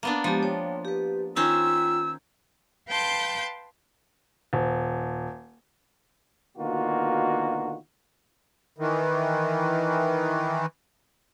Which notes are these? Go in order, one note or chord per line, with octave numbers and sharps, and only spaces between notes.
A#3 B3 D4
F3 G#3 B3 G4
C#5 G5
G4 B4
D#3 C#4 F4 C5 G5 A#5 E6
B4 F5 G5 A5 C6 G6
D#1
B2 D3 D#3 A#3 F4 F#4
D#3 E3